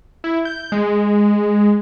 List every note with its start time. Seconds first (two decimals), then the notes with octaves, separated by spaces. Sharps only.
0.24 E4
0.45 G6
0.72 G#3